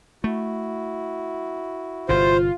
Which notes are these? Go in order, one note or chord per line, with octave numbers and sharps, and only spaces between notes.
A3 E4 F#4
G1 C3 F4 C5